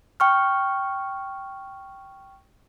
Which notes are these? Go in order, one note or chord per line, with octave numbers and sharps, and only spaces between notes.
G5 C#6 F6